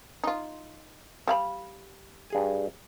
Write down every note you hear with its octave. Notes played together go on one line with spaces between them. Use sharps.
D#4 F4
G3 F5 B5
G2 G#4 G#5